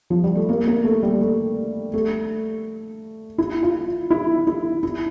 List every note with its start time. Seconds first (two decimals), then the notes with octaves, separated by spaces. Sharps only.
0.10 F3
0.24 G3
0.35 A3
0.49 A#3
0.67 A#3
0.84 A3
1.03 G3
1.21 A3
1.94 A3
3.38 E4
3.63 F4
4.10 E4
4.47 E4
4.83 E4